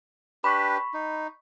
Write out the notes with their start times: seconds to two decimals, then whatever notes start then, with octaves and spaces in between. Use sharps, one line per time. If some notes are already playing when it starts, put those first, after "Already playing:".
0.44 D4 G4 B4 B5 C#6 B6
0.94 D#4